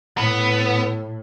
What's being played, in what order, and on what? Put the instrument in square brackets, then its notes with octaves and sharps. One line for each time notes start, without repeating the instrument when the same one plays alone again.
[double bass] A2 [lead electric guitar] B3